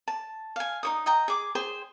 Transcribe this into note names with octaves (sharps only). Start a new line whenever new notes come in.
A5
F5 G#5
D#4 C#5 D#6
D#5 G5 A#5
G#4 D6
G#4 C5 G5